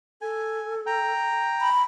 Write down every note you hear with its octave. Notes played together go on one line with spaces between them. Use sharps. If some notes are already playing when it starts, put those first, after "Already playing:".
A4 G#5
G5 A#5
B5